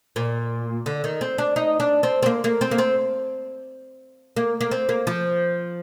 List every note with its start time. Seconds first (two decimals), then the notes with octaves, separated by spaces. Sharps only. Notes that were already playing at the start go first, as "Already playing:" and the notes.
0.16 A#2
0.86 D3
1.04 D#3
1.21 C4
1.38 D4
1.56 D#4
1.80 D4
2.03 C4
2.23 C4
2.26 A#3
2.44 A#3
2.61 C4
2.71 A#3
2.78 C4
4.36 A#3
4.61 A#3
4.71 C4
4.89 A#3
5.07 F3